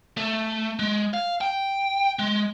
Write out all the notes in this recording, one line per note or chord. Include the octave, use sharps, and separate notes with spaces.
A3
G#3
F5
G5
G#3